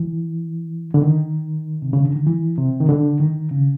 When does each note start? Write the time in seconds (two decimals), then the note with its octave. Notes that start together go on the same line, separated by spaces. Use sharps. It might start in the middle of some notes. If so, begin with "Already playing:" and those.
Already playing: E3
0.94 D3
1.02 D#3
1.82 C3
1.93 C#3
2.05 D3
2.15 D#3
2.27 E3
2.57 C3
2.80 D#3
2.89 D3
3.20 D#3
3.51 C#3